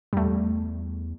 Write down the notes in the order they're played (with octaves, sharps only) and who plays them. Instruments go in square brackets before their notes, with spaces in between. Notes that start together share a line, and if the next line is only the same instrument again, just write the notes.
[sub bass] E2 [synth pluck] G3 A3